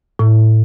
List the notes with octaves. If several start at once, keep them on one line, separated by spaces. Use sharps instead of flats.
A2